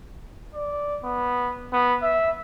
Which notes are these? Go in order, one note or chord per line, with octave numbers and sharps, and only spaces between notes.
D5
B3
B3
E5